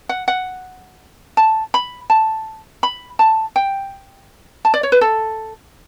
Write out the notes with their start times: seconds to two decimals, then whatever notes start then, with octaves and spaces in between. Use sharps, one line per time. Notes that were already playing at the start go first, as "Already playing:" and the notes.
0.09 F#5
0.28 F#5
1.37 A5
1.74 B5
2.10 A5
2.83 B5
3.19 A5
3.56 G5
4.65 A5
4.74 D5
4.83 C#5
4.92 B4
5.01 A4